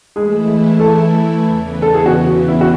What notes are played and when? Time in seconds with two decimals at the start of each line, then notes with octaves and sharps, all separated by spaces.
0.16 E3 G#3 A3 E4 G#4
0.79 A3 A4
1.43 E2 C#3 E3 B3
1.82 A4
1.94 G#4
2.06 F#4
2.48 E4
2.61 F#4